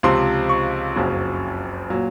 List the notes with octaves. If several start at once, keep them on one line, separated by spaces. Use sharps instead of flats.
C#2 C3 F3 C6
C#6
F#1 F2 C#3 F#3
A#2 F#3